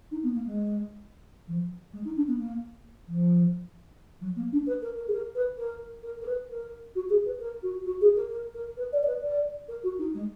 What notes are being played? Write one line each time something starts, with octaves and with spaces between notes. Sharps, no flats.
D#4
B3
A#3
G#3
F3
G#3
D#4
D4
B3
A#3
F3
F#3
A#3
D4
B4
A#4
A#4
G#4
A#4
B4
A#4
A#4
A#4
B4
A#4
F#4
G#4
B4
A#4
F#4
F#4
G#4
A#4
A#4
A#4
B4
D5
D5
B4
D5
A#4
F#4
D#4
G#3